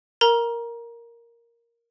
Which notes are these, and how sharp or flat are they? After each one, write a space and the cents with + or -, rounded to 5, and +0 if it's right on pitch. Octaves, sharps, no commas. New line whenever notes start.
A#4 +0 A#5 +20